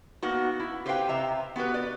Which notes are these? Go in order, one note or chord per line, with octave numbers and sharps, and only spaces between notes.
A#3 B3 D#4 F#4
E4
G4 B4 C5 D#5 F5 G5
C3 E5 A#5
B3 F#4 G4 B4
B4 D5